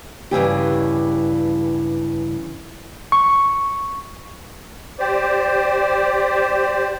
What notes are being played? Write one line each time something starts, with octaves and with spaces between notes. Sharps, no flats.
G2 C#3 E3 G4
C#6
G4 C5 D5